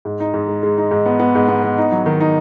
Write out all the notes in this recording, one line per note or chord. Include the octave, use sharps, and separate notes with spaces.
G#2
D#4
G#2
G#3
G#3
D#4
G#2
B3
B3
G#2
B3
B3
D#4
F#3
D#3
D#4